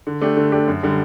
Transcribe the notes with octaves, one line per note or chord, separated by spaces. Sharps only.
D3
A3 D4 G4
D3
A3 D4 G4
F#2
D3 G3